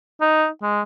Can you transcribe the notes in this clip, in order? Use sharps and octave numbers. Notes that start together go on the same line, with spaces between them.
D#4
G#3